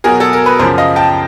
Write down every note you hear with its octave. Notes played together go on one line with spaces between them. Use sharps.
B2 F#3 G#4 A#4
A4
A#4
B4
F#2 C#3 F3 A#4 C5
D#5 F5
G5 A5